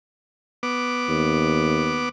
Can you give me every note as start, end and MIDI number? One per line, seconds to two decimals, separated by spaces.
0.63 2.09 59
0.63 2.09 86
1.09 2.08 39